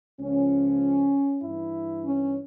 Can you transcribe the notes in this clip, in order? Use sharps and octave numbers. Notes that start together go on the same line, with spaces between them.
C#2 C#3 F3 C#4
G2 E3 E4
C#4